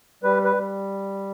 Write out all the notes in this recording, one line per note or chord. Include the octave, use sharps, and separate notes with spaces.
G3 B4
B4
G3